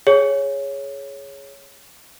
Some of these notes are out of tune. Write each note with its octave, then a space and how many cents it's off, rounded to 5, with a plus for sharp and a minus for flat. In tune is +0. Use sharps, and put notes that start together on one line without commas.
G#4 +0 C#5 +0